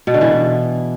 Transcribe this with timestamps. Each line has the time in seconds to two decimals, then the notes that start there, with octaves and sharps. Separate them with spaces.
0.07 B2
0.14 D3
0.21 E3